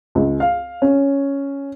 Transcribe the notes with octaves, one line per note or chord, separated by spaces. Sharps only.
C#2
F5
C#4